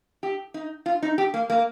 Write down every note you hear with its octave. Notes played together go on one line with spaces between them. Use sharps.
G4
D#4
F4
D#4
G4
A#3
A#3